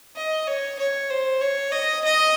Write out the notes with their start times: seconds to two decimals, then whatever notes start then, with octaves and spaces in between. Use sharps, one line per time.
0.16 D#5
0.47 C#5
0.79 C#5
1.10 C5
1.41 C#5
1.72 D#5
2.04 D#5